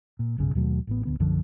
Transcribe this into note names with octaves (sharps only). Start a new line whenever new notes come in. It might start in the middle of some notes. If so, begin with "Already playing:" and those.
A#2
F#1 B1 G2 C#3
D#2 B2 F#3 A3
A1 A2 B3
D1 D3 B3
B1 F#2 D3 F3